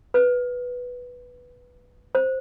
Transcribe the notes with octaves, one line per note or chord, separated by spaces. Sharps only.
B4
C5